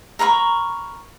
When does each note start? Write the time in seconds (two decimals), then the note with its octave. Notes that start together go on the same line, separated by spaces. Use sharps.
0.19 A#4 A#5 B5 C#6